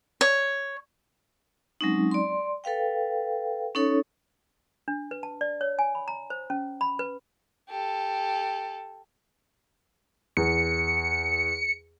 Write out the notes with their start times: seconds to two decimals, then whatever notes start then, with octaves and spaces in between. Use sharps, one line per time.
0.21 C#5
1.81 F#3 G#3 C4 C#4 D#4
2.11 D5 C6
2.64 A4 B4 F5 G5
3.75 C#4 D#4 A4 C#5
4.88 D4
5.11 B4
5.23 A5
5.41 D5
5.61 C#5
5.79 G#5
5.95 B5
6.08 A#5
6.30 C5
6.50 C#4
6.81 B5
6.99 B4
7.69 G4 A4
10.37 E2 C#7